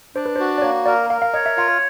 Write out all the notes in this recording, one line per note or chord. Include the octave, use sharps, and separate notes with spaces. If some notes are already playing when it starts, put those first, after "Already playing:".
D4 C5
B4
C5
F#4
D5
A#3 C#5
A#4 D5
A#4 F5
F5
C#5 D#5
E5
F4 F5